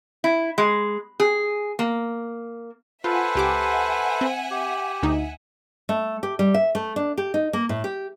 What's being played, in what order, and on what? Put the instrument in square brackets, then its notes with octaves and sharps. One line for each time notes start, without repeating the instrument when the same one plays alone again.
[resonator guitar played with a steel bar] E4
G#3
G#4
A#3
[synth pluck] F4 [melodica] A4 B4 C5 [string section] E5 F#5 G#5
[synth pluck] C#2 G4 D6
C4
[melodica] G4
[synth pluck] D2 D#4
[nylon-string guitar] A3
G4
G3
E5
A3
D4
G4
D#4
A#3
A2
G4